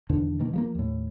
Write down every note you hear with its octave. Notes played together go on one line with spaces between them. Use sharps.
E2 B2 D3 D#3
B2 D#3 A#3
F3 F#3 A#3
D#2 A2